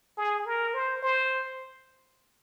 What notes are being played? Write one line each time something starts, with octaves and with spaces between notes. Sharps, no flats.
G#4
A#4
C5
C5